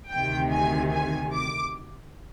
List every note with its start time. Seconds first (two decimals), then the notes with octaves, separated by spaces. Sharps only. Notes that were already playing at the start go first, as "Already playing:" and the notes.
0.11 D2 C3 D#3 G5
0.52 G#5
0.92 G#5
1.33 D6